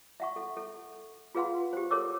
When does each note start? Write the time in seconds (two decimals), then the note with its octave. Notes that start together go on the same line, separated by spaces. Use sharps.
0.20 E5 F#5 C#6
0.36 A4
0.57 A4
1.35 F4 G#4 B4 F5 F#5 C6
1.73 G4 C5
1.91 A4 A#4 C#5 D6 E6